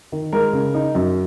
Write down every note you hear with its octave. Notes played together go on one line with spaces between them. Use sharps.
D#3
G#3 A#4
C#3
D#4
F#2